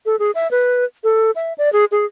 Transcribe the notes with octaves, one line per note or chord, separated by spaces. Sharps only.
A4
G#4
E5
B4
A4
E5
D5
G#4
G#4